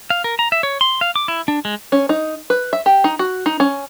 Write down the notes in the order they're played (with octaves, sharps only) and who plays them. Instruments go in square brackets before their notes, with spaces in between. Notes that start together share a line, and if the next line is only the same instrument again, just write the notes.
[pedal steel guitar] F5
A#4
A#5
E5
C#5
C6
F5
D6
E4
D4
G#3
[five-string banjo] C#4
D#4
B4
E5
G4
D#4
F#4
D#4
C#4